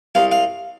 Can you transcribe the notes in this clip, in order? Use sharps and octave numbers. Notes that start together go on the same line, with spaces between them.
C2 F5
F5